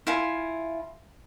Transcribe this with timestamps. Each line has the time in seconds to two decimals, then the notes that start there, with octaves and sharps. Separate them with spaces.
0.07 E4 F4 G#5